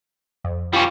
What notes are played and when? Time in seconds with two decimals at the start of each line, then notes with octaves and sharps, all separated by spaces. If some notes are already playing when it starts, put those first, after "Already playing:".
0.44 F2
0.73 G3 C#4 F4 D6